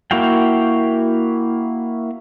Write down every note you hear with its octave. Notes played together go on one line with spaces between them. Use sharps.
A#3 E4 F#4 F5 G5